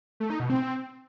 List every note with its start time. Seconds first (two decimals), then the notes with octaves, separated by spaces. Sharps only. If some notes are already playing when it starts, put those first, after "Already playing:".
0.20 A3
0.30 D#4
0.40 B2
0.50 C4